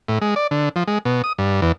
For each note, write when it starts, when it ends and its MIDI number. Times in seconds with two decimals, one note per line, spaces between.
0.08 0.19 45
0.21 0.35 56
0.36 0.47 74
0.51 0.69 50
0.76 0.84 53
0.87 0.98 56
1.05 1.22 47
1.24 1.33 87
1.38 1.61 43
1.62 1.72 40